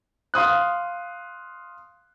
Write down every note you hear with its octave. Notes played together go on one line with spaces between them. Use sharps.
F5 C6 D#6 F#6